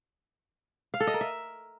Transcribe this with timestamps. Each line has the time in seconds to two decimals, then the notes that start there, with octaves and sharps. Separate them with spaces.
0.94 F5
1.00 A4
1.07 D#5
1.14 A#4
1.21 E5